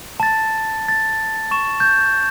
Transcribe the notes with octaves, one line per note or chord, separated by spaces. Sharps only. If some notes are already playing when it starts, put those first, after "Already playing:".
A5 A6
A6
C#6 E7
G6